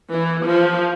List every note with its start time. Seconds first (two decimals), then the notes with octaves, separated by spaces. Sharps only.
0.12 E3
0.45 F3